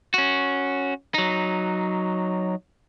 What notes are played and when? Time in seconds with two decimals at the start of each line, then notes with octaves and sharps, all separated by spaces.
0.14 C#4 F#4
1.14 F#3 D#4